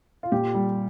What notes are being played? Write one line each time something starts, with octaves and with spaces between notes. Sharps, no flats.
F4
A#2 G4
G3